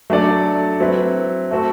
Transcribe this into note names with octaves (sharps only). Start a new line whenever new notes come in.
F#3 A3 D4 A4 D5
F#3 C4 E4 B4
A3 C4 F#4 A4